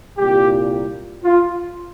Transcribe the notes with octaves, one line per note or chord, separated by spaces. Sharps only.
C2 A#2 G3 G4
F4